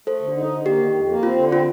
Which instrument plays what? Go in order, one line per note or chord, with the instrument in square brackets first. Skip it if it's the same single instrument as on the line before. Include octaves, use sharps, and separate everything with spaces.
[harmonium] A3 [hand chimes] A4 C5
[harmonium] D3
D#4
D3
[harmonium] A#3 [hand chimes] G4
[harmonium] D#3
F2
A#3
[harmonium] C4 [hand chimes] F4
[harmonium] D3
[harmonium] C4 [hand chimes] F4